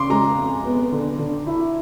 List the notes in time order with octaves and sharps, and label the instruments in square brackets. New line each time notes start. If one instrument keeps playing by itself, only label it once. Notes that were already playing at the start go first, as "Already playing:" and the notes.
Already playing: [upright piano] C#3 [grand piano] C6 D6
[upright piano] G#3 [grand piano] A#5
[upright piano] F2
B3
D3
D3
E4